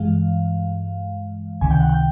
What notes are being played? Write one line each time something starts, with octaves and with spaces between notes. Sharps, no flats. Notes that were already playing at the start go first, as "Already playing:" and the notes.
Already playing: G2 E3 G#3 F5
C#2 C3 D#3 G#5
G5
F#5
G5